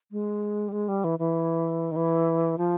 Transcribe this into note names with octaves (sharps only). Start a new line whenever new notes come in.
G#3
G3
G#3
G3
E3
E3
D#3
E3
F3